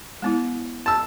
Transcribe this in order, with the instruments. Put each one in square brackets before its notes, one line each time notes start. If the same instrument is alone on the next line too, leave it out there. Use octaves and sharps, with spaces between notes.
[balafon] G#3 B3 E4
[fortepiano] A5 E6